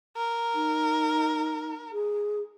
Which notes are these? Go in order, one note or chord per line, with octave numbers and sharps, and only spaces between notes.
A#4
D#4
G#4